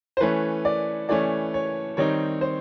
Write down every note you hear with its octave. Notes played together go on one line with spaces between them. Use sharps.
C5
E3 A3 C#4 B4
D5
E3 A3 C#4 D5
C#5
D#3 G3 C4 D#4 C#5
C5